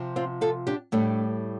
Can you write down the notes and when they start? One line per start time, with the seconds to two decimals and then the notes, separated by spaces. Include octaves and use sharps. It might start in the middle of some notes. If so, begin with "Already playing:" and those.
Already playing: C3 F3
0.16 C4 F4
0.41 F4 A4
0.67 D4 G4
0.92 A2 G3 A3 D4